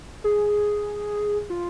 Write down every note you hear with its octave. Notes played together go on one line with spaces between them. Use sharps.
G#4
F4